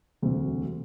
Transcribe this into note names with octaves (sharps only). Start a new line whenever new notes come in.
E1 D2 C3